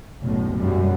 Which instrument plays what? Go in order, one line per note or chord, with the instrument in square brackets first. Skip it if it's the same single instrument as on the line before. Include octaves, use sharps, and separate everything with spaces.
[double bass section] F#1 B1 A2
F#2 G3